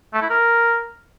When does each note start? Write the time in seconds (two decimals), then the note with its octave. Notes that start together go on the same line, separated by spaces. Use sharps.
0.13 A3
0.22 E4
0.30 A#4